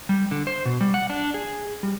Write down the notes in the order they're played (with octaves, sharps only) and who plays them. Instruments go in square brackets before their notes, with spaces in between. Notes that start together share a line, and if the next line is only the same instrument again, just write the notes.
[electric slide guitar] G3
D3
C5
B2
G3
F#5
D4
G#4
G3